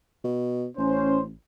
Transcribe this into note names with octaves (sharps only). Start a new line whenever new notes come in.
B2
A1 C#4 C5